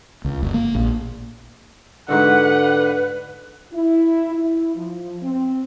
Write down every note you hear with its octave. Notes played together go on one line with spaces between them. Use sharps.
C#2
F#1
A#3
A#1
G#2 D3 F#4 A4 B4 F#5
E4
E4
F3
C4